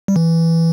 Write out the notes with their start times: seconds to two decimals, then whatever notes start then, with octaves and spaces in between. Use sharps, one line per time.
0.08 G3
0.16 E3